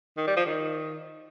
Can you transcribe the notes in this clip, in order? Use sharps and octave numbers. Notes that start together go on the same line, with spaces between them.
D#3
G3
F3
D#3